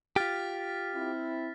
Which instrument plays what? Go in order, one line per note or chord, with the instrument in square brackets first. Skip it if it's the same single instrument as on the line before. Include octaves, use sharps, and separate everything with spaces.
[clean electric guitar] F4 G4 [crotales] F6 A6 B6
[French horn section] C4 E4